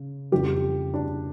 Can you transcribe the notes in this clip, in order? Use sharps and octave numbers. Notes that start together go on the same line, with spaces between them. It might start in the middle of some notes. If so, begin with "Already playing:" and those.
Already playing: C#3
F2 C#3 E3 G3 G4
D4